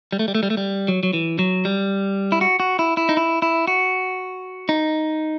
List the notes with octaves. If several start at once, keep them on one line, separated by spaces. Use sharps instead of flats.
G3
A3
G3
A3
G3
A3
G3
F#3
F#3
E3
F#3
G3
E4
F#4
F#4
E4
E4
D#4
E4
E4
F#4
D#4